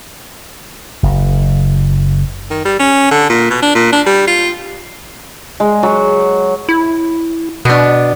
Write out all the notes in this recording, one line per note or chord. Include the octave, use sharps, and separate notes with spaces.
F#1
D#3
G3
C#4
D3
A#2
B2
D4
A#2
D4
G3
F4
G#3
F#3
E4
B2 B3 D4